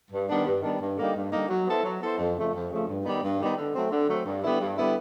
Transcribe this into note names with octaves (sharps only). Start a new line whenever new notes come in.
G2
D#3 G3 B3 D4
G2
D#3 G3 B3 D4
G2
D3 G3 A#3 D#4
G2
D3 G3 A#3 D#4
F#3
B3 E4 A4 C5
F#3
B3 E4 A4 C5
F2
C#3 F3 A3
F2
C#3 F3 A3
G2
D#3 G3 B3 D#4
G2
D#3 G3 B3 D#4
D3
F#3 A3 C4
D3
F#3 A3 C4
G2
D3 G3 B3 E4
G2
D3 G3 B3 E4